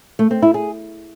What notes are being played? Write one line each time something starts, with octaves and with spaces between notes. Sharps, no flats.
A3
C4
E4
G#4